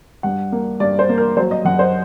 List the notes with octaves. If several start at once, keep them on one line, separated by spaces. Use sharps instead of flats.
G2 F#5
A#3
G2 D5
C5
A#3
A#4
F#3 C5
D#5
F#2 F#5
C5